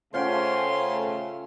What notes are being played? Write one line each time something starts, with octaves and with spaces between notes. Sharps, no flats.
C#3 A3 C#4 F4 C5 F#5 G5 C6